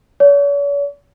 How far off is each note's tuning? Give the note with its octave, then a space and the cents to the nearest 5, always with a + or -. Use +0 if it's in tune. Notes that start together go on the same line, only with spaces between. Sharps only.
C#5 +45